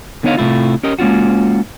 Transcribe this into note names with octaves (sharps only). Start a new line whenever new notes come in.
D3 B3 D#4 C#5 D#5 F5
A2 C3 A3 E4 F4
C#4 G4 A#4 D#5
G#3 A#3 C#4 F4 F#4